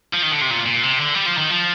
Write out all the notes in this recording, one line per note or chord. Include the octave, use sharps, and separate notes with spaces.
F3
D#3
D3
C3
A#2
A#2
C3
D3
G3
F3
D#3
F3